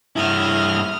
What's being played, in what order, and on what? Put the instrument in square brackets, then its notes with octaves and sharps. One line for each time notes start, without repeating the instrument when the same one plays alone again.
[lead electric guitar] G2 E4 [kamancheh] D#6 F6